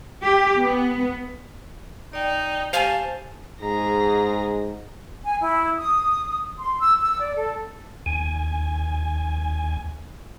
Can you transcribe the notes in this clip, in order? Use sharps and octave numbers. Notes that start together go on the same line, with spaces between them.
G4
B3
D#4 D5 G5
G4 C5 F5 G#5 A5
G#2 G#4 A#5
G#5
E4
D#6
C6
E6
E6
D5
A4
D#2 G#5